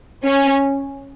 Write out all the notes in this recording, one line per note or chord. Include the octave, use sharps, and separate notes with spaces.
C#4